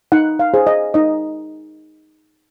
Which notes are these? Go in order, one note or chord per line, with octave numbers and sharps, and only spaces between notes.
D#4 F#5
F5
G#4 C5
D#5
D#4 D#5